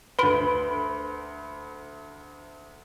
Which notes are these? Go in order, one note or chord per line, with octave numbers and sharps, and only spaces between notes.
D2 B4 B5 D7